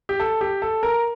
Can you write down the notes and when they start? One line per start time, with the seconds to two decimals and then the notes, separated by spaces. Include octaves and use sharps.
0.09 G4
0.20 A4
0.41 G4
0.62 A4
0.83 A#4